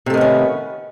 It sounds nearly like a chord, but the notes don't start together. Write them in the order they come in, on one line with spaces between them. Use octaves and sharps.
C3 A3 D#3 B3 C#4